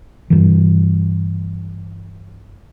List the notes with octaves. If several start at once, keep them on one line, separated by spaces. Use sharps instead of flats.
G2 E3